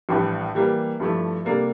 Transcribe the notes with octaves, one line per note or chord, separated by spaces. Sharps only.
A#1 A2 E3 G3
E3 G3 A#3
G2 F3 A3 E4
C3 G3 A#3 D4 A4